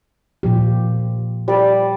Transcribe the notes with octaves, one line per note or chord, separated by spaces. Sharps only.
A#2 F3 G4
G3 D5